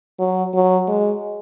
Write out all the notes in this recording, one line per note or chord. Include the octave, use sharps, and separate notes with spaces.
F#3
F#3
G#3